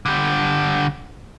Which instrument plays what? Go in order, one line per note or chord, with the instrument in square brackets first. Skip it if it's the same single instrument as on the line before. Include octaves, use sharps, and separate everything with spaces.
[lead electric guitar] D3 G3